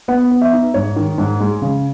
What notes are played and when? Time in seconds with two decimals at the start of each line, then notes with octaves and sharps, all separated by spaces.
0.08 B3 F#5
0.31 B3
0.42 E5
0.53 D#4
0.74 G#2 C#5
0.96 D#3
1.18 G#2
1.40 G#3
1.62 C#3